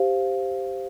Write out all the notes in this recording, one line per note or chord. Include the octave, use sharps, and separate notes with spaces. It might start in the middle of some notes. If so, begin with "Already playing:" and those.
Already playing: G4 C5 F5